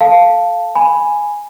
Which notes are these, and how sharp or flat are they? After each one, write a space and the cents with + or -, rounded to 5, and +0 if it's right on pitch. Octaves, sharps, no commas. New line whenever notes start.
A4 +0 F5 +0 A5 +0
G#5 +0 B5 +0